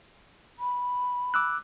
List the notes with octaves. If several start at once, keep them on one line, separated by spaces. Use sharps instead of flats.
B5
D6 E6 F#6